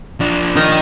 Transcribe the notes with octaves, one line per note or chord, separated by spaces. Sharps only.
F3 D4
D#4 A#4